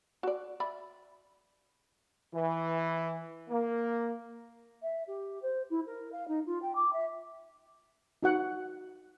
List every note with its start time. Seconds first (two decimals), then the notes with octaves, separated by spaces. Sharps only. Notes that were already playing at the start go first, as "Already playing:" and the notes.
0.23 F#4 D5
0.60 D5 E5 B5
2.33 E3
3.48 A#3
4.82 E5
5.07 G4
5.42 C5
5.70 E4
5.86 A#4
6.12 F5
6.28 D#4
6.46 F4
6.62 G5
6.75 D6
6.93 E5
8.23 D#4 F#4 F#5